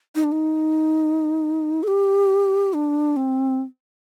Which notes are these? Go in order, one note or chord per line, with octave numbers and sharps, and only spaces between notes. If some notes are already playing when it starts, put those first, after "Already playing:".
D#4
D4
D#4
A4
G4
D4
C4